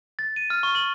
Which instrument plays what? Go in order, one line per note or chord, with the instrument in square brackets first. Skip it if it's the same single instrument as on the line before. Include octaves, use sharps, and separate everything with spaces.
[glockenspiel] A6
D#7
F6
C#6
F#7